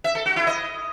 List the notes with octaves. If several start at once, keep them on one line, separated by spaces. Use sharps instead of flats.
E5
A4
F#4
E4
D#5